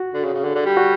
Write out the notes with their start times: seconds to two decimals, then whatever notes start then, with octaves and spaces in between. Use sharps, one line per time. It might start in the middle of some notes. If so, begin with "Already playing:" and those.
Already playing: F#4
0.14 D3
0.24 C#3
0.34 C#3
0.44 D3
0.55 D3
0.66 G3
0.77 F#4